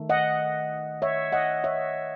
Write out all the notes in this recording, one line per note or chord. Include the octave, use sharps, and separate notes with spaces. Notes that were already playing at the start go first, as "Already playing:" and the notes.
Already playing: D#3 A3
D#5 F#5
C#5 E5
D#5 F#5
C#5 E5